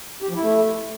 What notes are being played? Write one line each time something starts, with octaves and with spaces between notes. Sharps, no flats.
G4
F3
E4
A3